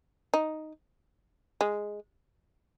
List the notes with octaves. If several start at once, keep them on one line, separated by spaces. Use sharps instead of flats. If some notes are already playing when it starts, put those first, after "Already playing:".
D#4
G#3